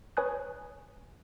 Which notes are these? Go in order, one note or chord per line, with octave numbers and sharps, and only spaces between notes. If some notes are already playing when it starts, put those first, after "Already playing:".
B4 C#5 G#5 D#6 F#6